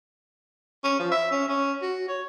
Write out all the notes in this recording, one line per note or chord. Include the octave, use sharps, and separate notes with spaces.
C#4
F3
E5
C#4
C#4
F#4
C#5